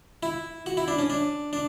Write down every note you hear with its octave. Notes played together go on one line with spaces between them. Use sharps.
E4
F#4
E4
D4
C#4
D4
D4